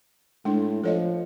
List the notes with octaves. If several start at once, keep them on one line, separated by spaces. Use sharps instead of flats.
A2 G#3 D4
F3 A4 C#5 D#5